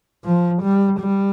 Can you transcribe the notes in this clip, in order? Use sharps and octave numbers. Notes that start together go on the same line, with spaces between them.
F3
G3
G3